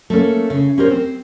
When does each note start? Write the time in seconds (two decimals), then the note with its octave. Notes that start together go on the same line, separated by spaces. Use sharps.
0.10 A3 A#3 C#4
0.50 C#3
0.78 C#4 G4 A#4 C5
0.90 C4